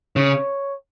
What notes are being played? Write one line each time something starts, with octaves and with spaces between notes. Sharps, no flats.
C#3 C#5